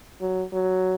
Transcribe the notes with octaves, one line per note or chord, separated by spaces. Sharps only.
F#3
F#3